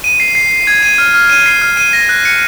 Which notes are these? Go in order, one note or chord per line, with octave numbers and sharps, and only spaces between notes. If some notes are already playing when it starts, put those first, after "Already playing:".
D#7
C7
C7
C7
G#6
D#7
F6
F6
D#7
C7
F6
D#7
A#6
F#6
C#7